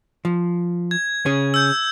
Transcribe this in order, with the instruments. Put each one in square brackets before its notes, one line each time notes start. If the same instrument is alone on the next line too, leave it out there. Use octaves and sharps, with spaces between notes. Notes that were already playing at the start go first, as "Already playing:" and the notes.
[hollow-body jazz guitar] F3
[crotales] G#6
[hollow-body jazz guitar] C#3 C#4 G#4
[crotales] E6 G6